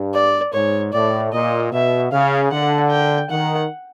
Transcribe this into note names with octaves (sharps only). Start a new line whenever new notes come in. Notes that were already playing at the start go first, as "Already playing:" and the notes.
Already playing: G2
D5
G#2 C#5
A2 D5
A#2 D#5
B2 E5
C#3 F5
D3 F#5
G5
D#3 F#5